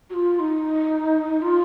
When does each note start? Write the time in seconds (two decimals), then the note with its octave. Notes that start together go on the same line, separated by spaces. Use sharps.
0.10 F#4
0.14 F4
0.39 D#4
1.42 F4